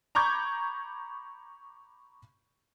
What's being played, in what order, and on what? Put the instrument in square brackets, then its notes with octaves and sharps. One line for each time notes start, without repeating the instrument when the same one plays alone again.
[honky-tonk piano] A#5 B5 C#6 D6 G6 G#6